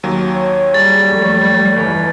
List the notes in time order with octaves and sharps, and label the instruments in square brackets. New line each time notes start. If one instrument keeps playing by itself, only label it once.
[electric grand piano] D#2 F#3
[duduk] C#5
[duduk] G3 [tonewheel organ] G#4 [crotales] A6
[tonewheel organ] F2 A3 C#5
[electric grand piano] G1 [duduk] E3